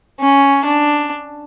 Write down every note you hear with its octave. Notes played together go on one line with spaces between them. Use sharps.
C#4
D4